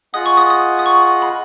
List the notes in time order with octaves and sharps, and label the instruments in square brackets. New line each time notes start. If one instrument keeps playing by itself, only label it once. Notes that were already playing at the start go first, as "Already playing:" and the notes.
[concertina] F4 G#4 D#5 F#5 [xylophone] D#6
[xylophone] C#6
D#6
D#6
D#6
C#6
B5